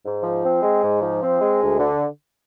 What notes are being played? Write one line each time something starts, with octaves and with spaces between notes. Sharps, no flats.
G#2
F3
C4
G#3
G#2
F3
C4
G#3
D2
D3